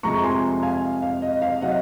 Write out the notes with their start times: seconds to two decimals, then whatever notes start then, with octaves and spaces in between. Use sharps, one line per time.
0.03 F2 C3 F3 G#3 A#5 C#6
0.23 G#5 C6
0.63 F5 G#5
1.02 F5
1.22 D#5
1.42 F5
1.61 C3 F#3 D#5 F#5